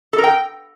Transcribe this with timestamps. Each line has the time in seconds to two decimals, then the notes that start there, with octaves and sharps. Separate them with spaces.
0.13 A4
0.18 A#4
0.24 G5